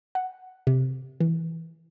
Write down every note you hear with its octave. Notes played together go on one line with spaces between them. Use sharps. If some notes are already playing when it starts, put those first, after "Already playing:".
F#5
C3
E3